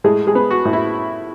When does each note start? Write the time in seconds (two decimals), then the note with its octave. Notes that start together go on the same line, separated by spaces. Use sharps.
0.04 A2 G#3 G#4
0.27 G#3 G#4
0.35 B3
0.50 F#4
0.65 A2
0.73 E4